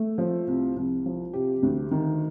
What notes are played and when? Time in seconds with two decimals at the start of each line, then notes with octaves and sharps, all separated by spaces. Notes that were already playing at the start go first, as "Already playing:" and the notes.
Already playing: A3
0.18 F3
0.47 C2
0.76 C2
1.06 F3
1.33 C3 G4
1.63 D2
1.91 D#3